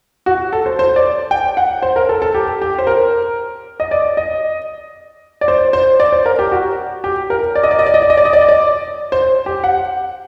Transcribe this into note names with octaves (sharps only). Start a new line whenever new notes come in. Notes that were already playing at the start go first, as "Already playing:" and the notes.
F#4
A4
C5
C5
D5
G5
F#5
C5
A#4
A4
A4
G4
G4
C5
A#4
D#5
D5
D#5
D5
C5
C5
D5
C5
A#4
G4
F#4
G4
A#4
D5
D#5
D5
D#5
D5
D#5
D5
D#5
D5
D#5
D5
D#5
D5
C5
G4
F#5